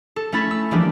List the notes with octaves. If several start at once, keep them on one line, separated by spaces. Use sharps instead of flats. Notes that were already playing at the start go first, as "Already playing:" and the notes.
A4
A3 C#4 E4 B5 A6
E6
E3 F3 G3 G#3 A#3 D4